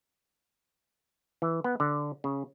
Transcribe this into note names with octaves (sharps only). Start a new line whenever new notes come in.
E3
B3
D3
C#3